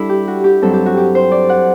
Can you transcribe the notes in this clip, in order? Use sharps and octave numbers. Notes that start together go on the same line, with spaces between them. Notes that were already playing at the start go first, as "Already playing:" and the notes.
Already playing: G3 D4 E4 A4
G4
F#4
G4
G2 F#3 C4 A4
G4
F#4
G4
C5
D5
F#5